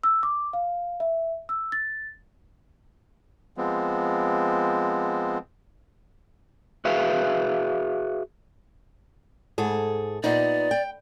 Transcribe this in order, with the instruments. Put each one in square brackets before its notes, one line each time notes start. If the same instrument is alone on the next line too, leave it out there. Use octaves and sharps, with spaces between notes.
[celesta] E6
D6
F5
E5
E6
A6
[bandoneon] F3 G#3 B3 C4
[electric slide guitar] F#4 G#4 B4 E5 F5
[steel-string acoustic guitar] G#2 G#4 A4
[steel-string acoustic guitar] A#2 B3 D#4 [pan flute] D5
[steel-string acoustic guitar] G5